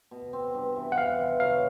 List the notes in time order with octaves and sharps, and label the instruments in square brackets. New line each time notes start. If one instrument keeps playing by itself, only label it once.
[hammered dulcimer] B2
C4
G2
E3
[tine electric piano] F#5
[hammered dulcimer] E3 [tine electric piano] F5
[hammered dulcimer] E3
[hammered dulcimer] F#3 [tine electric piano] F5